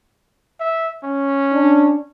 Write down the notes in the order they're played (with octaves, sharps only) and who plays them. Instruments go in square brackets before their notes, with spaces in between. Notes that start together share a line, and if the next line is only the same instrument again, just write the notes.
[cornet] E5
C#4
[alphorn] D4